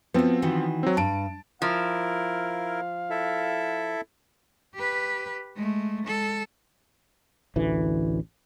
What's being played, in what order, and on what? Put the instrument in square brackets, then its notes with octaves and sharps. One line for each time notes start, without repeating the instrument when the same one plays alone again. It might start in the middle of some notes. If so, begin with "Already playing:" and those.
[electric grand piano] F3 C4 [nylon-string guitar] B3 F#4
[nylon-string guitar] D#3 E3 F#4
[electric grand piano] F#3 C4
[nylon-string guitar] G2 [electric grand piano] A5 D7
[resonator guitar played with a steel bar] F3 [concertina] E4 A#4 [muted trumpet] F5
[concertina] E4 A4 E5
[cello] G4 B4
G#3 A3
G#3 A4
[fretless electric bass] A1 D2 E3